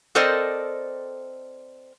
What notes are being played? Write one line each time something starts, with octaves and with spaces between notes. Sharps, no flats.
C4 A4 A#4 C5 D5 D#5